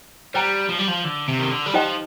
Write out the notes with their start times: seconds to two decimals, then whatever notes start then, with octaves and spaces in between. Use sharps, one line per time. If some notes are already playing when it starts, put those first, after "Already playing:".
0.34 G3 C5 G5 A#5
0.69 F3
0.79 G3
0.88 F3
1.05 D3
1.28 C3
1.39 D#3
1.50 D3
1.66 G3
1.74 F3 D#4 G4 C5 D#5 G5